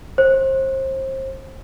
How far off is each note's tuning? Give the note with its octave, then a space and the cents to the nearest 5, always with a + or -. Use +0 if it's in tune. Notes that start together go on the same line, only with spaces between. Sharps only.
C5 +30